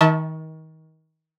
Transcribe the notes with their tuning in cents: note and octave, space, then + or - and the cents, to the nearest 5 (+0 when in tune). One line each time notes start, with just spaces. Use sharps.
D#3 +30 E5 -40 A5 +0